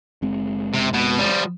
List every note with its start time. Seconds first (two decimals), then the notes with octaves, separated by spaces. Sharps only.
0.22 F#1 G#3 C4
0.74 C3
0.94 B2
1.19 F3 G3